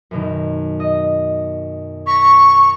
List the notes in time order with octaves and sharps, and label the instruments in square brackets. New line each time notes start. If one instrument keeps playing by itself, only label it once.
[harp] F#2 B2 D#3
D#5
[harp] A#5 B6 [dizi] C#6